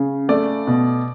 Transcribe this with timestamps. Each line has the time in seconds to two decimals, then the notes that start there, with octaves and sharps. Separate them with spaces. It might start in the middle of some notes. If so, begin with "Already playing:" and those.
Already playing: C#3
0.29 A3 D5
0.67 B2